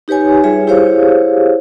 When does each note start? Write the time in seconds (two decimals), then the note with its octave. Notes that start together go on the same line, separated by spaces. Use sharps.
0.08 D#4 G4 B4 C#5 G#5
0.44 G3 F4 G#4 C#5 E5
0.67 E4 G4 G#4 C5 C#5 F5